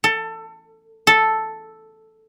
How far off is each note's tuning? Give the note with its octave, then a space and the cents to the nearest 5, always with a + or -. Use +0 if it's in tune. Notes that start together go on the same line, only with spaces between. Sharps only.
A4 +20
A4 +0